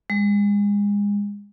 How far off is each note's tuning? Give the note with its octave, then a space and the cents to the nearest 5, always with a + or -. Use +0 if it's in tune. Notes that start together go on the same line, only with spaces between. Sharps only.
G#3 -30